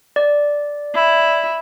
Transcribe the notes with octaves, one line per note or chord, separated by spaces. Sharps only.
D5
E4